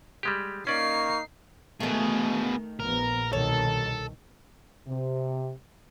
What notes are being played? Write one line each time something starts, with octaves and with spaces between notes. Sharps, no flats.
G3 G#3 G4
A#3 C#4 D#4 D5 C#6 C7
B2 D#3 A3 G#4
A#1 B3 A#4
C2 B2 D#3 A4 C#5
C3